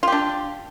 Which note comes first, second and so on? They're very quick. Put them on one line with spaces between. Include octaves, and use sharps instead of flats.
F4 G4 D4